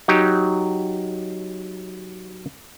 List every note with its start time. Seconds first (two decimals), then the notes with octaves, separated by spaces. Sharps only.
0.08 F#3 D#4 G4